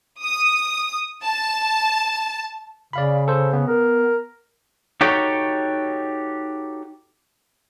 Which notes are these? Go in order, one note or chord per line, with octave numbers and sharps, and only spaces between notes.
D#6
A5
C#3 D5 F5 B5
A4 C5
B3
A#4
D#4 F#4 G4 A4 C#5